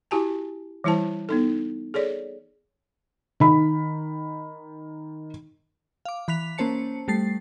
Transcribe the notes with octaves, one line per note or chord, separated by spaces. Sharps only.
E4 F#4 G4 G#5 A5
E3 G3 E4 C5 A5
B3 D#4 A4
G#4 A4 C#5 D5
D#3 B5
F5 D6
E3 B5 F#6 B6 F7
A#3 C#4 C5 A5 C#7
G3 A3 A6 C7